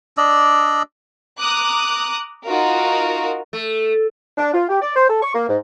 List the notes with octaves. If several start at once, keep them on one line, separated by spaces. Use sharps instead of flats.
D4 D5 D#5 E6
A#5 D6 D#6 F#6
D#4 F4 F#4 A#4
A3
D4
F4
G4
D5
C5
A4
C#6
A#3
G#2